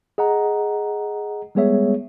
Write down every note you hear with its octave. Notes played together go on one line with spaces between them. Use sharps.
G#4 D#5 F#5 A#5
G3 G#3 B3 G#4 C#5 E5